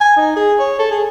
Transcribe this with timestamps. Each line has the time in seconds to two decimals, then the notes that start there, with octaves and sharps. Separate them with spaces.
0.01 G#5
0.17 D#4
0.36 G#4
0.59 C#5
0.79 A4
0.91 G#4